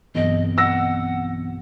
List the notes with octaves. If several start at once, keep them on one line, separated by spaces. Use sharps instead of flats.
B1 G2 E3 B3 C4 D#5 D7
F#5 E6 A#6